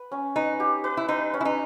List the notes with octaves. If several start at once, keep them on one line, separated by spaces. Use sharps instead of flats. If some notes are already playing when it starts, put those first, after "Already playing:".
Already playing: B4
C#4
D#4 B4
G4
B4
E4
D#4 B4
C#4
E4
D#4